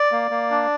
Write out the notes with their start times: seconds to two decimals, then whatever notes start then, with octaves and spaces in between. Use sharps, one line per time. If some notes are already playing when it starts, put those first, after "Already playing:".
Already playing: D5
0.12 A#3
0.31 A#3
0.51 D4